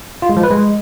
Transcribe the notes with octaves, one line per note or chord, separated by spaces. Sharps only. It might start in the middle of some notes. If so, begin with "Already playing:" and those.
F4
G#3
F3
B4
G#3